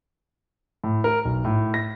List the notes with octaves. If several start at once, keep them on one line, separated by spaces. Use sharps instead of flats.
A2
A#4
B1
A2
A#6